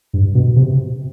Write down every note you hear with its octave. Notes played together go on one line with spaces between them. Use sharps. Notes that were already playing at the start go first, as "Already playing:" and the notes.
G2
B2
C3